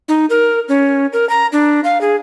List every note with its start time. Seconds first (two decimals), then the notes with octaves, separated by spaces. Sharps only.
0.08 D#4
0.30 A#4
0.69 C#4
1.13 A#4
1.29 A#5
1.52 D4
1.84 F5
2.01 G#4